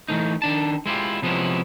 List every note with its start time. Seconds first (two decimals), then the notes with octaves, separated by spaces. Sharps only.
0.09 E3 A3 D#4
0.42 D#3 D4 A5
0.86 G#3 E4 F4 G4
1.22 C3 F3 G#3 B3 C#4 E4